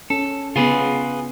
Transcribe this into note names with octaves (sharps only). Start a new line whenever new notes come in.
C#4 A4
C#3 B3 F4 G#4 B4